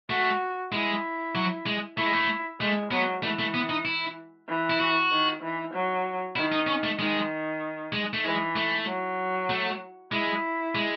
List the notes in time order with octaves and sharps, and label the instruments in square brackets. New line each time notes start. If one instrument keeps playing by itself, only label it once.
[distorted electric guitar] A3 [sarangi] F#4
[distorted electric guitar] G#3 [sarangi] E4
[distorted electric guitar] F#3
G#3
[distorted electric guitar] A3 [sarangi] E4
[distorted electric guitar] G#3
A3
[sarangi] G#3 [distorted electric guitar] A3
[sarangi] F#3 [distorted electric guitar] B3
[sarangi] E3 [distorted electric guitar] A3
[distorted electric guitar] A3
B3
D#4
E4
[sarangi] E3
[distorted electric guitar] E4
F#4
[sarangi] D#3
E3
F#3
[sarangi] D#3 [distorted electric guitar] E4
[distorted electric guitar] D#4
C#4
A3
[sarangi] D#3 [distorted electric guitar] G#3
[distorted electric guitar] G#3
A3
[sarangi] E3 [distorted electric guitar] G#3
[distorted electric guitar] A3
[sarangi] F#3
[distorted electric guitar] A3
[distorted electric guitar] G#3 [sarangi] E4
[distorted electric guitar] G#3